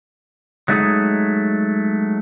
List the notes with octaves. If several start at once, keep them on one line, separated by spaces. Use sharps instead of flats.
F#3 G#3 A3 D#4 F4 G#4